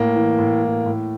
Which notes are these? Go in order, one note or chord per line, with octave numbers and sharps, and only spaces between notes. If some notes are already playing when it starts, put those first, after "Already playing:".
Already playing: A2 A#3
E3
A2
A2
A2